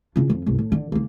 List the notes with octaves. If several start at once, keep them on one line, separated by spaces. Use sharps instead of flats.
C#3 F4
F2
G1 C2
A2
D3
C#2 A#3